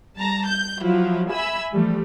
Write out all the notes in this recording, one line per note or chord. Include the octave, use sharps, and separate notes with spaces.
G3 A5 A#5
G6
F3 F#3 E4 F4
E5 G#5 B5 E6
E3 F3 G3 A3